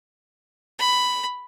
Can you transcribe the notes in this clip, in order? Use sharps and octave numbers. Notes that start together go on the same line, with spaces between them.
B5